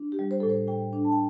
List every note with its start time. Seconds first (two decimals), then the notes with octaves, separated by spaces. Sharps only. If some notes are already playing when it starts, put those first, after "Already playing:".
Already playing: D4
0.12 G4
0.19 G3
0.31 C5
0.40 A2 A4
0.49 C5
0.68 A2 G5
0.93 D4
1.05 A5
1.12 G5